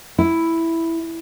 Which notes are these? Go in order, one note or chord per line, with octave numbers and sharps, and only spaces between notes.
E4